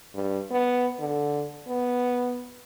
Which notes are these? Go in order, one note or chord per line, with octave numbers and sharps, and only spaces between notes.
G2
B3
D3
B3